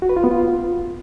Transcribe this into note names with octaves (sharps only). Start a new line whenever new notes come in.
F#4
B4
F4
B3
F4